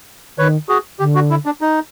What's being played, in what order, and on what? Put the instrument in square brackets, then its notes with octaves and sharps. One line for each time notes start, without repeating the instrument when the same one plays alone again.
[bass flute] D#3 [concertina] B4 C#5
[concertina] F#4 G#4
[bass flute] D3 [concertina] G4
[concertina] F#4
E4
D4
D#4